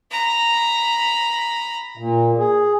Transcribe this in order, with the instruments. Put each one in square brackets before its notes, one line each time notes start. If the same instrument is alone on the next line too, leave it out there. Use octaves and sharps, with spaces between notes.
[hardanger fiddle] A#5 B5
[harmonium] A#2
G#4